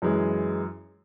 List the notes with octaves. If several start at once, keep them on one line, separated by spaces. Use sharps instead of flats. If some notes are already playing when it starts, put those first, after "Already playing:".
F#2 E3 G#3